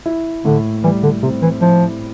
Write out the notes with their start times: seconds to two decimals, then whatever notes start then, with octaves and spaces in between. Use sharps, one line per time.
0.06 E4
0.45 A2 D3
0.84 E3 G3
1.03 D3
1.23 C3 C4
1.42 E3
1.61 F3 E4